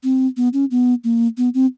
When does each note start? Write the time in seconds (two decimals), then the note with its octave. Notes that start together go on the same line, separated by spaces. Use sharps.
0.03 C4
0.37 B3
0.53 C#4
0.71 B3
1.04 A#3
1.37 B3
1.54 C4